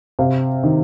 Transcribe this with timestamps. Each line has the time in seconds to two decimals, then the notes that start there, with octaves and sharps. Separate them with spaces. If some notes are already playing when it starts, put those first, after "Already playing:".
0.19 C3 F5
0.63 D#3